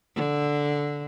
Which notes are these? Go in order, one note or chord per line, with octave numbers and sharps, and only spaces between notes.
D3